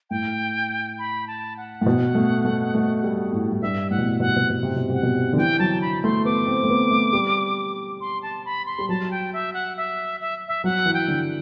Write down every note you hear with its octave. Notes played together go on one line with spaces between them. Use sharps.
A2 G5
B5
A5
F#5
A2
B2
A3
A3
A3
G3
A2
A2
G2 E5
A2 F#5
B2
A2
B2 F#5
C3
B2
B2
C3
B2
C3 F#5
B2
D3
E3 G5
F#3 A5
B5
A3 C6
B3 D6
C4
A3
B3
A3
G3
C6
A5
B5
C6
G3
F#3 A5
G5
E5
F#5
E5
E5
E5
F#3 F#5
E3
G5
D3